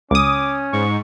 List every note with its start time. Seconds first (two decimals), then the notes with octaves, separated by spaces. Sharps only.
0.11 C#2 C#4 D6 D#6
0.73 G#2 C#6